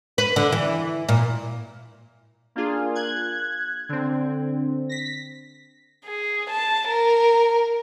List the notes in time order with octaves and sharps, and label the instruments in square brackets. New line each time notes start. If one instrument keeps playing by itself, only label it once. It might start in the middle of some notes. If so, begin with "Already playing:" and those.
[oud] B4
D3
E3
A#2
[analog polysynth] A#3 D4 F4 G#4
F#6 G#6
D3 C4
A#6 B6
[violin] G#4
A5
A#4